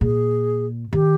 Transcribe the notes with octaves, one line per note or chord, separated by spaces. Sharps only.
A#2 G#4
D#3 G4